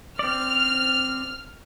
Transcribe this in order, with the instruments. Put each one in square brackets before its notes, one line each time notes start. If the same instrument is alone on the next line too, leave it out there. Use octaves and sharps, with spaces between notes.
[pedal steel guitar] C4 D5 [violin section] F6